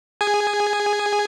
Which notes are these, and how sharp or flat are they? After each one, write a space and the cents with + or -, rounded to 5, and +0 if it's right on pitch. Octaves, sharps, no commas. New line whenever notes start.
G#4 -15 G#5 +0